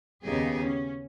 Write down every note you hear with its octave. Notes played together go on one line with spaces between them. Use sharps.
D#2 C#3 B3 D#4 G4 G#4
C#4